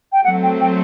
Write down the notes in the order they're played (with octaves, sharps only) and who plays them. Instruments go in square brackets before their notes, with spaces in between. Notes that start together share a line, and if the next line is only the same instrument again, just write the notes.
[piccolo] G5
[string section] F#3 A3 C4 [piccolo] F#5
[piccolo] G5
G5